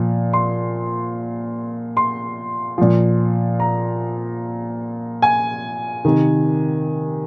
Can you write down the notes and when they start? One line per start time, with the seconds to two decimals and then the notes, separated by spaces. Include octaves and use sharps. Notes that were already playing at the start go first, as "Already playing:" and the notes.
Already playing: A#2 F3
0.33 C6
1.97 C6
2.78 A#2 F3
3.60 A#5
5.22 G#5
6.05 C3 D#3